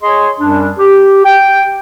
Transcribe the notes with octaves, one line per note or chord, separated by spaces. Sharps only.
G#4 C#5 D#5 C6
F#2 G3 D4
G4
G5